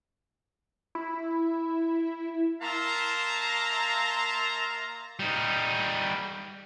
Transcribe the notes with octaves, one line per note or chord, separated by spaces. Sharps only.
E4
A#3 E5 F5 A5 A#5 C6
G3 D#4